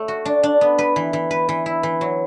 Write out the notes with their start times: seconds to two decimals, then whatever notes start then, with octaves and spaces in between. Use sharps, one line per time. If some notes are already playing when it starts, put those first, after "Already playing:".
Already playing: A3 C#5
0.08 F#4
0.25 D4
0.43 D4
0.61 B3
0.78 B4
0.96 E3
1.13 E3
1.31 B4
1.49 E3
1.66 E4
1.83 E3
2.01 F#3